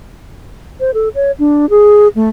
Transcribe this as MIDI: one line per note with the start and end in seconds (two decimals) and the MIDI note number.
0.80 0.91 72
0.94 1.09 69
1.15 1.32 73
1.39 1.69 62
1.70 2.08 68
2.15 2.29 57